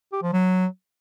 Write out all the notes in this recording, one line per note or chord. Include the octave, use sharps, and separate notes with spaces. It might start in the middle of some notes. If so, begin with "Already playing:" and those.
G4
F3
F#3